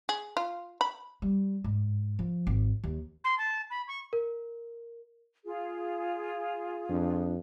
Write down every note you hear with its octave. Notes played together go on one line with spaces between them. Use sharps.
G#4
F4
B5
G3
G#2
F3
G#1
D#2
C6
A5
B5
C#6
A#4
F4 G#4
F2 D4